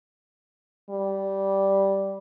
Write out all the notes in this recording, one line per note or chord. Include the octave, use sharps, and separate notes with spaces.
G3